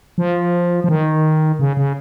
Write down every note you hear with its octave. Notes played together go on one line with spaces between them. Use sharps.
F3
F3
D#3
C#3
C#3